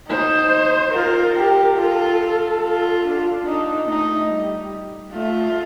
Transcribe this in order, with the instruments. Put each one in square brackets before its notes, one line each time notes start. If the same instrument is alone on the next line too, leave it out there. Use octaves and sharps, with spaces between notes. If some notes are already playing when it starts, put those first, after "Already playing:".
[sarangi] D#4 [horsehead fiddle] C5
[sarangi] F4 [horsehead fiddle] A#4
[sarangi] G4
[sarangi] F4 [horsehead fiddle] A4
[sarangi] F4
[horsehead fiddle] D4
[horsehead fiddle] D4 [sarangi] D#4
[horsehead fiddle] A3 [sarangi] D#4
[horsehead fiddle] G3
[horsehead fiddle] A3 [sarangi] F4